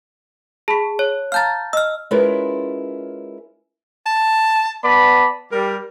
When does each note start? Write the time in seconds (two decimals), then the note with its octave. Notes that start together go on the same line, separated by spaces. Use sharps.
0.68 G#4 A5 B5 B6
0.99 C#5
1.32 F5 A5 A#5 F6 G6 A6
1.73 D#5 E6 F6
2.11 G#3 C#4 E4 F4 A#4 B4
4.06 A5
4.84 B3 D5 A5 B5
5.52 G3 A#4